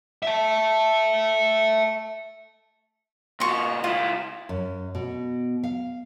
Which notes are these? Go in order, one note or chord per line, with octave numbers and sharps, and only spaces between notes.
E5 A5
A#2 F#4 C6 C#6
C#2 E4 F4
F#2
B2
F5